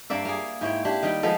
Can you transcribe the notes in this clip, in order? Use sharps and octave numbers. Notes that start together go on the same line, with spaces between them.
G2 A#3 D5 E5
A#3 G#4
G#2 E4 C#5 G5
D4 E4 G4
D#3 G3 G5
F3 G#3 B3 A4